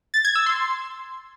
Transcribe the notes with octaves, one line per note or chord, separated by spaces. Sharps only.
A6
G#6
E6
C6